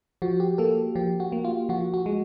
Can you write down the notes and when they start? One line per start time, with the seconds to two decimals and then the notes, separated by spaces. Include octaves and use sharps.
0.22 F3 F#4
0.40 G4
0.58 A#3 A4
0.95 F3 G4
1.20 F#4
1.32 A#3
1.45 F4
1.69 F3 F#4
1.94 F#4
2.06 G#3